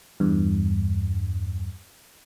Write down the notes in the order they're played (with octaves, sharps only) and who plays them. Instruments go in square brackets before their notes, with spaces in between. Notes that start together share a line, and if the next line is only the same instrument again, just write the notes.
[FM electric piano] E2 G2